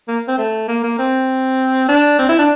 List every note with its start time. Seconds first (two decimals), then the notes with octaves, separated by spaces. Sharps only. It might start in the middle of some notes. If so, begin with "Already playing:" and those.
0.08 A#3
0.28 C4
0.38 A3
0.68 A#3
0.84 A#3
0.99 C4
1.89 D4
2.19 C4
2.29 E4
2.39 D4